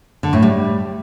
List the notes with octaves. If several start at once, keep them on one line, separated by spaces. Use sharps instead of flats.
D3
A2
G3